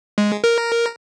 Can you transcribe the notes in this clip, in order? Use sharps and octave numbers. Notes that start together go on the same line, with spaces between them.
G#3
A#4